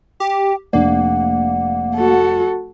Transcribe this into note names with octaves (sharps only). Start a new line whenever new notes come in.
G4 G5
F1 A#3 D4 D5 F#5
F#4 A4